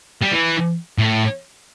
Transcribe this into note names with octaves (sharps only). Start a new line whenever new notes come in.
G3
E3
A2